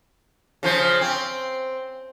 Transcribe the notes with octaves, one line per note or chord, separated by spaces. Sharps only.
C#3 F3 C5
C4